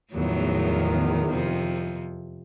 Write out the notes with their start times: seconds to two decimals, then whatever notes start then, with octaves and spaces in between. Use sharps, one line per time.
0.14 E2 A2 D#3 F3 F#3
1.28 F2 C3